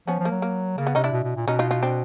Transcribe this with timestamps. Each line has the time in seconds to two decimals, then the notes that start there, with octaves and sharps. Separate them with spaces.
0.07 F3 B3 C#4
0.19 F3
0.25 A#3
0.31 F#3
0.42 A#3
0.78 C#3 A#3
0.87 B3
0.95 C3 C#4 D#4
1.04 D4 E4
1.12 B2
1.24 B2
1.36 A#2
1.47 B2 C#4 D#4
1.59 D#4 F4
1.71 D#4 F4
1.82 C4 D4